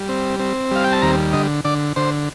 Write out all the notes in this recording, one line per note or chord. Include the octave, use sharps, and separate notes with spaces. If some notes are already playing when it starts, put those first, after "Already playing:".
Already playing: G3
C4
C4
G3 F5
G5
A5
D#2 A#5
D3 D#5
D3 D5
D3 C5